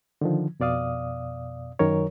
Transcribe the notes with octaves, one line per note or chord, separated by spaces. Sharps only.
D3 D#3 F3
F2 B2 D5 F5 D#6
F#2 D#3 F#3 A#4 C#5